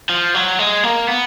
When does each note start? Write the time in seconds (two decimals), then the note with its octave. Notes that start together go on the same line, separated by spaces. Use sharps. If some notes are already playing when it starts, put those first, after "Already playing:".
0.09 F3
0.35 F#3
0.59 G#3
0.84 A#3
1.08 B3